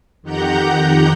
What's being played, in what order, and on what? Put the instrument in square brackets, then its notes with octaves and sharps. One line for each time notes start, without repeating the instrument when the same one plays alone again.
[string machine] F2 D#3 G4 F#5 A#5 G6